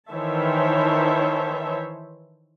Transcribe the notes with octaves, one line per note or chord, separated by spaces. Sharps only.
D#3 E3 C5 C#5 E5 A5